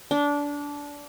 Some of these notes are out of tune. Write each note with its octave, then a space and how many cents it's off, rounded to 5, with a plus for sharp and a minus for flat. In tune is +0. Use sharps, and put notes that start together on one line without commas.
D4 -20